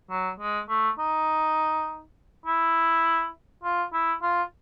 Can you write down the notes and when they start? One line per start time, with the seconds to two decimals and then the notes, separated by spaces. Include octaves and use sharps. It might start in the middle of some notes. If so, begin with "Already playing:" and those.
0.10 F#3
0.40 G#3
0.69 A3
0.99 D#4
2.46 E4
3.63 F4
3.93 E4
4.22 F4